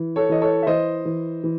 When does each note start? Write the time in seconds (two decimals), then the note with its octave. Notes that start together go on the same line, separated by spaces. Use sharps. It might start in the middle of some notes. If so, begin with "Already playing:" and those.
Already playing: E3
0.16 A4 C#5
0.29 E3 D#5
0.41 A4 C#5
0.63 E5
0.67 E3 C5 D#5
1.05 E3
1.44 E3